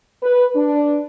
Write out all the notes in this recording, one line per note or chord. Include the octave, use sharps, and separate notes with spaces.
B4
D4